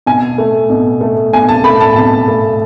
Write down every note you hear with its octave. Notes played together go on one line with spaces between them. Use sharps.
B2 G#5
A3
B2
A3
B2 G#5
A5
A3 B5
A5
B2 A5
A3